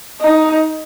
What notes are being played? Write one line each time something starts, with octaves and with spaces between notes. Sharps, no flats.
D#4